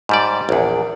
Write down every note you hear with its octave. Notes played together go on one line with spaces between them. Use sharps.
G#2 G3 D5
A#1 E2